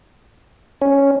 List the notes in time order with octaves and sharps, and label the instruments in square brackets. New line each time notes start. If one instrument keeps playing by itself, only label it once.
[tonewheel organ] C#4